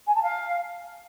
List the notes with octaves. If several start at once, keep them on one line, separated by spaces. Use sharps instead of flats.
G#5
A5
F5